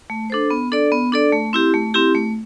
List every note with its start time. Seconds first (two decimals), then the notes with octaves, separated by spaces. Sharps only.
0.10 A3
0.30 D4 A4 C5
0.50 B3
0.72 D4 A4 D5
0.92 B3
1.12 D4 A4 D5
1.33 A3
1.53 C4 E4 G4
1.74 A3
1.94 C4 E4 G4
2.15 A3